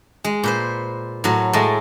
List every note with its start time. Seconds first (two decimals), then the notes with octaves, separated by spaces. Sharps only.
0.24 G#3
0.43 A#2 B4 C5
1.24 A2 F#3
1.53 A2 G#3 A3